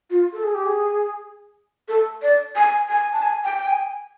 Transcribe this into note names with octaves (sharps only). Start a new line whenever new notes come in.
F4
A4
G#4
G4
G#4
A4
D5
G#5
G#5
A5
G#5
G5
G5
G#5